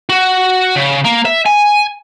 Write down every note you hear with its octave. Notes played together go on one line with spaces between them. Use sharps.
F#4
C#3
A#3
E5
G#5